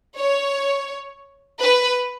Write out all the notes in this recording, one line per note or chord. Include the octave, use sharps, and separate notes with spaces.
C#5
B4